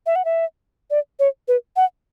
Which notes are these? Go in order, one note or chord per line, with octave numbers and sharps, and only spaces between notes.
E5
F#5
E5
D5
C#5
B4
F#5